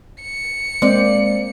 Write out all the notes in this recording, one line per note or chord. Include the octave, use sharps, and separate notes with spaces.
C#7
G#3 A#3 C4 C5 D5